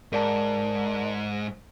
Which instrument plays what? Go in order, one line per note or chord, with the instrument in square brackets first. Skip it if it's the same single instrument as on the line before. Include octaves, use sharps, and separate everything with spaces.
[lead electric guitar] G#2 [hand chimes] A#4 D5 A5